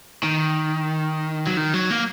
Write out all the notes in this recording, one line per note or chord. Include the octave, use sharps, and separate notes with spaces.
D#3
F#3
D#3
F#3
A#3